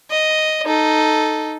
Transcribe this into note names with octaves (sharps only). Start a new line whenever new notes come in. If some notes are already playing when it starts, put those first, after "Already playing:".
D#5
D#4 A4